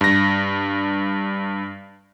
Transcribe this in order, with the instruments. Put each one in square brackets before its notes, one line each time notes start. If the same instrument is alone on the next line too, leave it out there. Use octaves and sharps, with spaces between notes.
[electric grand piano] G2 A#6